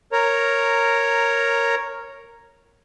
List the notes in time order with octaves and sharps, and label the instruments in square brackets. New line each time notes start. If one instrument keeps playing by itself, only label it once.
[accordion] A#4 C#5 A#5